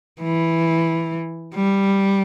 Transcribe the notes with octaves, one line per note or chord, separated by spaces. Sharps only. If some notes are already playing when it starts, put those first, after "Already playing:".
E3
G3